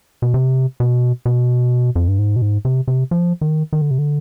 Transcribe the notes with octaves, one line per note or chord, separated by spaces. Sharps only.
B2
C3
B2
B2
F2
G2
G#2
B2
G#2
C3
C3
F3
D#3
D#3
D3
C3
D3